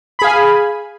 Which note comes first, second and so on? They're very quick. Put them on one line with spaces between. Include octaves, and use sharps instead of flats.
B5 G#4 F5 G#5